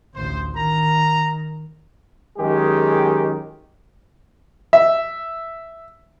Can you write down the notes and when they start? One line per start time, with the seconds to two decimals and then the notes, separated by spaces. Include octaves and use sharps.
0.15 A1 D2 C5
0.56 D#3 A#5
2.38 F#2 D#3 G#3 G4 G#4
4.73 E5